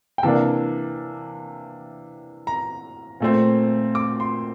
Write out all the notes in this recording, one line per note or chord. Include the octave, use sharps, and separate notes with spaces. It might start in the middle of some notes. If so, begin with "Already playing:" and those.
G5
C3 E3 A#3 D4 A5
A#5
A#2 A3 C4
D6
C6